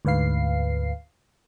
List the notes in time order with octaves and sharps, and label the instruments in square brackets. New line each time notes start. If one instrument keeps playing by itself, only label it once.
[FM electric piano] D2 G#2 B4 F5 C7